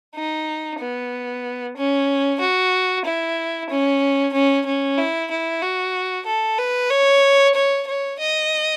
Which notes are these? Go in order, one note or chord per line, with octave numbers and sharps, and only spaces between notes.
D#4
B3
C#4
F#4
E4
C#4
C#4
C#4
E4
E4
F#4
A4
B4
C#5
C#5
C#5
D#5